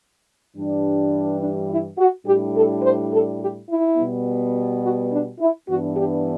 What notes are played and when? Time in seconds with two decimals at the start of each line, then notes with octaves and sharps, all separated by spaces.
0.55 G2 E3 G3 D4
1.39 D4
1.69 E4
1.98 F#4
2.25 A2 G3 D4 G4
2.55 A4
2.82 C5
3.11 A4
3.39 G4
3.68 E4
3.96 B2 G3 B3
4.82 F#4
5.11 D4
5.39 E4
5.67 G2 E3 B3 D4 F#4
5.95 G4